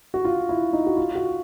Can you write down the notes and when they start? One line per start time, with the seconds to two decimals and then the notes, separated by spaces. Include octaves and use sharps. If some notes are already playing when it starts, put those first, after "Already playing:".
0.14 F#4
0.25 F4
0.49 E4
0.73 D#4
0.87 F#4
0.97 F4
1.15 F#4